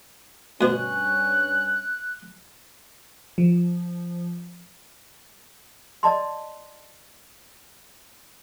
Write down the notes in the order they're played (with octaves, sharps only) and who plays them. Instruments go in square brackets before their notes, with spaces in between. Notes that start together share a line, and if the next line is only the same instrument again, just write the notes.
[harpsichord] D2 B2 [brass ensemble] G2 C#4 [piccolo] F#6
[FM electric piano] F3
[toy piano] D5 D#5 A5 C6